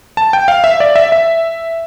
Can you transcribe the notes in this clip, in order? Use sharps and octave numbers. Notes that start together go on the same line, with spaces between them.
A5
G5
F5
E5
D5
E5
E5